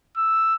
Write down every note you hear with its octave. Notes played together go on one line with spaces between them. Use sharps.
E6